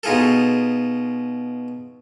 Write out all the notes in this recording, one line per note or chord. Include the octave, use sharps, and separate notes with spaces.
B2 D#4 F4 G#4 A4